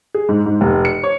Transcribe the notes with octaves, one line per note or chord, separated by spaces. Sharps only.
G#4
G#2
G#2
F1
C#7
C#5